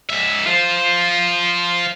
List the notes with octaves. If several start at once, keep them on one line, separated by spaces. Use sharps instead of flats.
G#2 E5
F4 C5